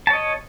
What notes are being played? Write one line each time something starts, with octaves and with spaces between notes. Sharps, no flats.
C#5 D#5 A5